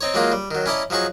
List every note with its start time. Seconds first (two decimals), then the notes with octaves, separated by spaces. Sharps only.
0.01 C4 D#4 C#5
0.14 F#3 G#3 A#3 D#4 F4
0.32 G3
0.51 D#3 F#3
0.66 C#4 E4 D5 D#5 A5 A#5
0.90 F3 F#3 D#4 G#4 C#6